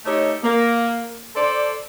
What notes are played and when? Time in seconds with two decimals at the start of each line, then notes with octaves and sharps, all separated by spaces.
0.05 A3 D#4 G4 A4 C#5 D#5
0.42 A#3
1.35 A4 C5 D5